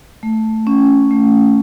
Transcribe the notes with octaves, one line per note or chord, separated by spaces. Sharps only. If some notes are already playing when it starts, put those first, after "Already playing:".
A3
C#4
A3